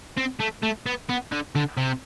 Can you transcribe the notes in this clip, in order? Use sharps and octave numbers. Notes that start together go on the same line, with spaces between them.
C4
A3
A3
B3
B3
D3
D3
C3